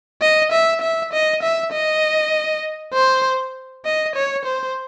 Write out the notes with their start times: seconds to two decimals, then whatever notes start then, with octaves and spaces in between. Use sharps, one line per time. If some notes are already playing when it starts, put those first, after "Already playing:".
0.21 D#5
0.52 E5
0.82 E5
1.13 D#5
1.43 E5
1.72 D#5
2.94 C5
3.85 D#5
4.15 C#5
4.45 C5